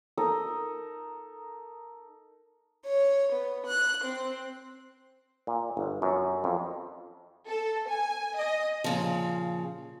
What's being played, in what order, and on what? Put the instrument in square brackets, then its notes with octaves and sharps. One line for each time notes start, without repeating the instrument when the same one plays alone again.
[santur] D#4 A4 A#4 D#6
[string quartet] C#5
B3
F#6
C4
[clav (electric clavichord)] A#2
G1
F#2
F2
[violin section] A4
G#5
D#5
[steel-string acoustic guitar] A#2 C#3 F3